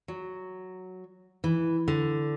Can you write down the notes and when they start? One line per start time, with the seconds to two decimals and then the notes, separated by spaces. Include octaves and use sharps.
0.08 F#3
1.44 E3
1.88 D3